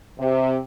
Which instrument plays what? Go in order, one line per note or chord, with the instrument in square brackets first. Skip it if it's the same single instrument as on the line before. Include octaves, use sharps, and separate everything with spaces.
[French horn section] C3